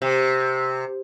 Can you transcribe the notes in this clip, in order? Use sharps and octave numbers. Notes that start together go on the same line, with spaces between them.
C3